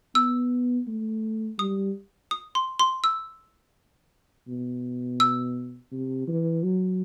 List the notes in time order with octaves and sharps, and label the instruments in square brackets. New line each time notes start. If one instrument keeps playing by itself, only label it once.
[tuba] B3 [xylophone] E6
[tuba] A3
[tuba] G3 [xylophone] D#6
[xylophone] D#6
C6
C6
E6
[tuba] B2
[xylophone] E6
[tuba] C3
E3
F#3